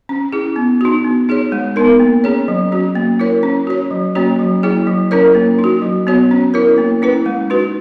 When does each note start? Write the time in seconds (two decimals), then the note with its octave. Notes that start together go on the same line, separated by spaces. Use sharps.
0.09 C#4
0.32 E4 G#4
0.56 B3
0.81 D#4 F#4
1.04 B3
1.29 D#4 G#4 C#5
1.52 G#3
1.76 B3 D#4 A#4
2.00 A#3
2.24 C#4 G#4 C#5
2.48 F#3
2.72 C#4 F#4
2.95 A#3
3.20 E4 A#4 C#5
3.43 C#4
3.67 F#4 C#5
3.91 F#3
4.15 A#3 C#4 F#4 C#5
4.39 F#3
4.63 A#3 E4 G#4 C#5
4.87 F#3
5.11 C#4 E4 A#4 C#5
5.35 A#3
5.59 D#4
5.64 F#4
5.82 F#3
6.07 B3 F#4 C#5
6.31 C#4
6.54 E4 A#4 C#5
6.78 A#3
7.02 C#4 E4 B4
7.26 G#3
7.50 D#4 F#4 B4